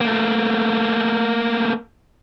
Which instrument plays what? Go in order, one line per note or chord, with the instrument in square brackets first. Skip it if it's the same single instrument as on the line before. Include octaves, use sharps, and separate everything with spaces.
[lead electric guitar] A3 A#3